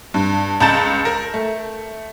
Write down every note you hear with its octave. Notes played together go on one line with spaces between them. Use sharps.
G2
C#2 A5 A#5 G6 A6 E7
A#4
A3